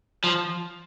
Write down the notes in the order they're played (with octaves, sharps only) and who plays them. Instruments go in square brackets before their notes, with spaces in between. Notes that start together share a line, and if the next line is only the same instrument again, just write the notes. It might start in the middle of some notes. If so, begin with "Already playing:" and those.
[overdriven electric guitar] F3